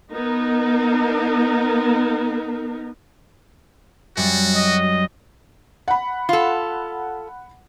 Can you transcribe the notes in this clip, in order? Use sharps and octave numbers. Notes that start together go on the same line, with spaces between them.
B3 D#4 A#4
F#2 G3 F#4
D#5
F#5 B5
F4 A4